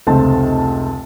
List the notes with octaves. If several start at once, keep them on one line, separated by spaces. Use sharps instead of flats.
F1 C#2 A3 C4 A5